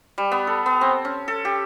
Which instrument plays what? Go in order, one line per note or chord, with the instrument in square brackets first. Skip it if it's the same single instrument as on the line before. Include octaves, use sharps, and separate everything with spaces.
[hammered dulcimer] G3
B3
A4
B3
C4
C#4
A4
G4